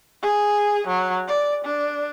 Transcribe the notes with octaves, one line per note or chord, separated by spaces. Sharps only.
G#4
F#3
D5
D4